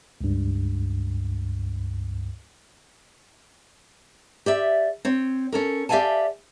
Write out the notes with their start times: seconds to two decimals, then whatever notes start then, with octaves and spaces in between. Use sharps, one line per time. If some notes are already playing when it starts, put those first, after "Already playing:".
0.21 C#2 G2
4.46 G4 D5 E5
5.05 C4 C#5
5.52 C#4 A4 A#4
5.89 G4 D5 E5 F5 G#5 A5